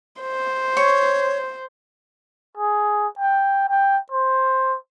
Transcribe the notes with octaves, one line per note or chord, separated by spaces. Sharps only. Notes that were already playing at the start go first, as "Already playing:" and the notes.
C5
C#5 C#6
G#4
G5
G5
C5